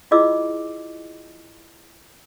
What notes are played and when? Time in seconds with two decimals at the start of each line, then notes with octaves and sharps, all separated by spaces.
0.11 E4 F4 G#4 D#5 D6 E6